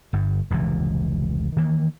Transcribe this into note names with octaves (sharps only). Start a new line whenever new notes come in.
G1 G2
F1 C#2 A#2 E3
D#3 E3 A#3